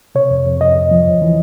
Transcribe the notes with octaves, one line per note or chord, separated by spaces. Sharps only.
C3 C#5
F2
F2
F2 D#5
F2
F3
E2
E3